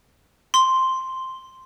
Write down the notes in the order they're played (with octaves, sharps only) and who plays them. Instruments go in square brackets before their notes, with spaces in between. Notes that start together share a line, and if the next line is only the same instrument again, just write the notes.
[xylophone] C6